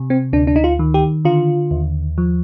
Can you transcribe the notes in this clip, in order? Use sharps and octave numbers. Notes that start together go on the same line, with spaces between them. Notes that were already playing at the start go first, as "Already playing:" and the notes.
Already playing: C3
C4
D2 D4
D4
D#4
F4
D#3
G4
D3 F4
D#2
F3